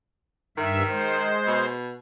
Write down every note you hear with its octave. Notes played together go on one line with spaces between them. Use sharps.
G2 D#3 E5
G#3 C5
B2